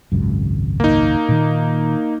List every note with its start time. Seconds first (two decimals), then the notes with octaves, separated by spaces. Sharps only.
0.12 G#1 C#2 F#2
0.80 A#3 D#4
1.29 A#2 D#3